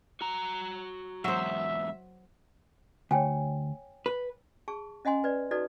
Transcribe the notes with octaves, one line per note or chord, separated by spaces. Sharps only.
F#4 A#5
E2 G#2 F#3 C5 E5
D2 C#5 G5 G#5
B4
G#4 A5 C#6
C#4 D#5 F#5 G#5 C6
B4 D5
D#4 F#4 A4 B4 D5